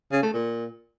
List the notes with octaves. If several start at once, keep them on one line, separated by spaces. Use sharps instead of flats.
C#3
A3
A#2